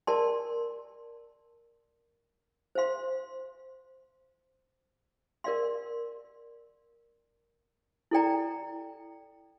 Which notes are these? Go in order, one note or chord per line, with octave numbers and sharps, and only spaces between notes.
A#4 D5 A5 C6
C5 F5 C6
A#4 D5 F5 C6
E4 A4 D5 G5 A#5